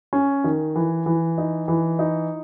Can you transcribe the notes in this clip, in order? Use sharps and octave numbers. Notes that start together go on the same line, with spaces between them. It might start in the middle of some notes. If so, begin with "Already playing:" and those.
C#4
D#3
E3
E3
D#4
E3
D#4